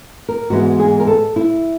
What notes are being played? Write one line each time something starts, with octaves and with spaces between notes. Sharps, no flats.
A#4
G#2 E3 G#3 B3 F#4
G#4
A#4
A4
E4